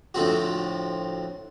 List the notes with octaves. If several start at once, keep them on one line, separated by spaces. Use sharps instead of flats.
D2 A2 F3 C4 F#4